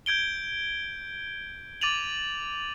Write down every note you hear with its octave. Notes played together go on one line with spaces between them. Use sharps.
G6 G#6 D7 G7
D6 A6 D#7 F7 F#7